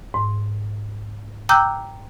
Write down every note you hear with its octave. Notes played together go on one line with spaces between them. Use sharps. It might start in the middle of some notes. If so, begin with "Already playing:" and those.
G#2
G5 A#5 D6 E6 F#6 G6